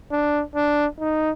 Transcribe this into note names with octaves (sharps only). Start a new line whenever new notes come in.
D4
D4
D#4